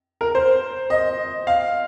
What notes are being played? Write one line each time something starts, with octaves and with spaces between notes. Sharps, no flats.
A#4
C5
D#5
F5